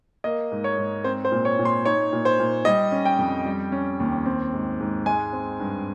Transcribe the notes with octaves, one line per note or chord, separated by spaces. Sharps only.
A#3 D#5
G#2
C#5
G#2
C4 C5
C5
A#2
C#5
A#2
C6
D#4 C#5
A#2
C5
A#2
G3 D#5
C#4
G5
F2
G3
C#4
D#2
C4
G#2
G#2
G#3 G#5
C4
G2